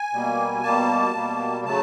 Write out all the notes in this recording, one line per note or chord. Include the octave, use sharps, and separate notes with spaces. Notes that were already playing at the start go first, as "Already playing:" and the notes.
Already playing: G#5
B2 G3 A#3
B2 G3 A#3 A5
B2 G3 A#3
C#3 F#3 A3 A5